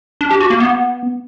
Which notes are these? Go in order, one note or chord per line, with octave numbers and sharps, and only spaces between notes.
D4
G4
F#4
A#3
B3